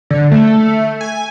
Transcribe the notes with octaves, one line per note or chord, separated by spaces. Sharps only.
D3
A3
G#5